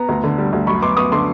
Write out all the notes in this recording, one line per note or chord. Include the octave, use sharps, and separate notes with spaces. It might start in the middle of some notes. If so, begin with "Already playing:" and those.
Already playing: B3 A#5
D2
D3
G3
D2
F#2 B5 C#6
B3 C6 D6
B3 C#6 D#6
D3 C6 D6